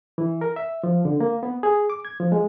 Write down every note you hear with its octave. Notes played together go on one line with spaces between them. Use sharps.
E3
A#4
E5
F3
D3
A#3
B3
G#4
D6
G#6
F3
G#3